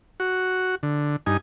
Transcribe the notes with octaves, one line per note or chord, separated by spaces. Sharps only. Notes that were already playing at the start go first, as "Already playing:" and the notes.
F#4
D3
G2 D#4 G#5